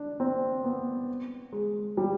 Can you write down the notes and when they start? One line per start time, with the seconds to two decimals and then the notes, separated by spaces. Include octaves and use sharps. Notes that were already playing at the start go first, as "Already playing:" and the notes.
Already playing: D4
0.20 C4
0.65 B3
1.53 G#3
1.97 G3